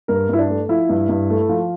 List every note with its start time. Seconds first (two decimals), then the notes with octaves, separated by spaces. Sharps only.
0.08 G2 A#4
0.29 G2 E4
0.39 D4
0.49 A3
0.69 F3 E4
0.89 G2
1.09 G2
1.30 A3
1.49 F3